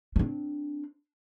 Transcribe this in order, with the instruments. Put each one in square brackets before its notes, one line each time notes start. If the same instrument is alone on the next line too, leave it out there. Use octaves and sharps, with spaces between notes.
[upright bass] C4 D4